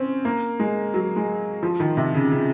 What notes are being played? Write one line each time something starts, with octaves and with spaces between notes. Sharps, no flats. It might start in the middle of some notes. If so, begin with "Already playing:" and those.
Already playing: C4 C#4
A#3
G#3
F#3
G#3
F3
D#3
C3
C#3
C#3